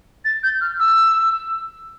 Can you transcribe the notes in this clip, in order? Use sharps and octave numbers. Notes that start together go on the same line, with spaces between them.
A6
G6
F6
E6